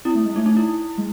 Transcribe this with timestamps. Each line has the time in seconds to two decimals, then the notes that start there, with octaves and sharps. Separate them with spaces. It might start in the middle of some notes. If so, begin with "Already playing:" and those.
0.05 C4 E4
0.15 A3
0.26 G#3
0.36 A3 D#4
0.46 D#4
0.57 E4
0.98 G#3